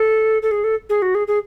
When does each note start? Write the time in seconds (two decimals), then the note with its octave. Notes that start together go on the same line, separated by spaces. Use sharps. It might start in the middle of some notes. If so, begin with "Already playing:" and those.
Already playing: A4
0.42 A4
0.51 G#4
0.64 A4
0.89 G#4
1.02 F#4
1.15 G#4
1.27 G#4